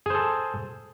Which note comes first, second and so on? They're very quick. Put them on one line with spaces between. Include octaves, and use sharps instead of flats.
G#4 C5 A4